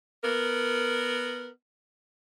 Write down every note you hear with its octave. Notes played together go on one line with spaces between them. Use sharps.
B3 A#4